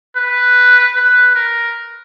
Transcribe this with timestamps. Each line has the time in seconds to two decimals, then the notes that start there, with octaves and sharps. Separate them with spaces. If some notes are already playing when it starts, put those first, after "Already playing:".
0.16 B4
0.96 B4
1.35 A#4